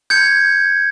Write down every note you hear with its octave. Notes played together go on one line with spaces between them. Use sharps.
G6 G#6 C#7